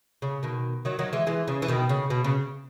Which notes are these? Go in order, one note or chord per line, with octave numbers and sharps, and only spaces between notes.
C#3
B2 D#3
D#3 F#3
D#3 F#3
E3 G#3
E3 G#3
C#3
E3
B2 D#3
C#3
B2
C#3